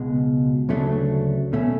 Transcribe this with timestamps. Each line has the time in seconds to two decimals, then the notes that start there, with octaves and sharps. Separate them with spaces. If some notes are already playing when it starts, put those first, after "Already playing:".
Already playing: C#2 B2 G#3
0.69 D2 C#3 F#3 A3 D4
1.53 B2 A3 C#4